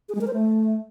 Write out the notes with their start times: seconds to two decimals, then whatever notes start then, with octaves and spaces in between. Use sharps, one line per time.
0.09 G#4
0.15 G#3
0.21 A#4
0.27 C5
0.33 A3